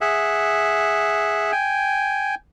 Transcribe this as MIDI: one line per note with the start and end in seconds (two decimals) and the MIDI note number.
0.01 1.52 68
0.01 1.52 76
0.01 1.52 78
1.52 2.35 79
1.52 2.35 80